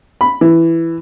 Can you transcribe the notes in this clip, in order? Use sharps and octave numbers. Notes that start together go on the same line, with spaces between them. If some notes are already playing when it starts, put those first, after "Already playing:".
B5
E3